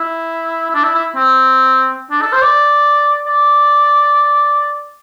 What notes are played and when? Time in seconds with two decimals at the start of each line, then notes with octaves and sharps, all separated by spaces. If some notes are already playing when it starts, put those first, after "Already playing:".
Already playing: E4
0.70 E4
0.75 D4
0.84 E4
0.95 E4
1.16 C4
2.11 D4
2.21 A4
2.32 C5
2.43 D5
3.26 D5